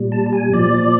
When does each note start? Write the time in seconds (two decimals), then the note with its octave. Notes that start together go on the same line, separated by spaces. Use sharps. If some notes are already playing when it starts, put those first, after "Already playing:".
Already playing: A#2 G3
0.12 A5
0.33 G#5
0.53 A#2 F3 D5